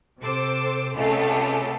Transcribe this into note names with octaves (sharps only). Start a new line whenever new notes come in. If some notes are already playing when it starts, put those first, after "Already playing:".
C3 A4 C5 D6 E6
C#2 C3 A3 A4 F5